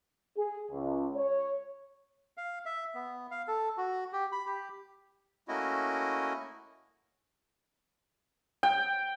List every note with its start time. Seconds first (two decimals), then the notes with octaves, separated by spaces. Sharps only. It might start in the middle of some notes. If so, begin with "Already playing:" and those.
0.37 G#4
0.71 C#2
1.16 C#5
2.37 F5
2.65 E5
2.95 B3
3.31 F5
3.48 A4
3.77 F#4
4.13 G4
4.32 B5
4.46 G4
5.48 A3 A#3 C#4 E4 F#4 D#5
8.63 G5